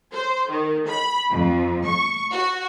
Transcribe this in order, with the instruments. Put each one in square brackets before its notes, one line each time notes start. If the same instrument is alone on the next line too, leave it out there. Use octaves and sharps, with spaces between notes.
[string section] C5
D#3
B5
F2
C#6
F#4